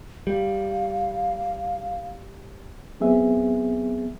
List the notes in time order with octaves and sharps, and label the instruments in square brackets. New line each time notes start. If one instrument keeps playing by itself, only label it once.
[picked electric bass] G3 [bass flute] F5
[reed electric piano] F#3 B3 C4 G#4 E5